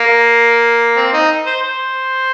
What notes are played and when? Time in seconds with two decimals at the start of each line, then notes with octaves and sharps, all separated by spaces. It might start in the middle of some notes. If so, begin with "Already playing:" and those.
Already playing: A#3
0.97 C4
1.13 D#4
1.46 C5
1.62 C5